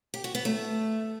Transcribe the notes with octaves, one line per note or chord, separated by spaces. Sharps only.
G4
F#4
B3
A3